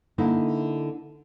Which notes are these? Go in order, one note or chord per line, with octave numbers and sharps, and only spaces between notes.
D3 A#3 D#4 E4